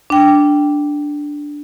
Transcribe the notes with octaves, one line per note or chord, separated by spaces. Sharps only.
D4 G5